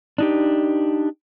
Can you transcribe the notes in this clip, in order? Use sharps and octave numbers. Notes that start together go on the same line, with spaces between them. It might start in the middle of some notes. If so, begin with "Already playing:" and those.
D4 D#4 G4